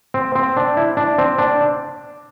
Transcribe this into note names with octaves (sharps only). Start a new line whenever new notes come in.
C4
C4
D4
E4
D4
C4
D4